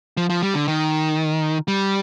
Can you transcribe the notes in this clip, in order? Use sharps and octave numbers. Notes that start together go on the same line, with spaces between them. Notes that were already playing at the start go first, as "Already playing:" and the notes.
F3
F3
G3
D3
D#3
G3